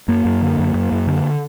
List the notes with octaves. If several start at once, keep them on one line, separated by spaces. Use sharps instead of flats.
F#2 A#3
F#2
D3
F#2
F#2
F#2
D3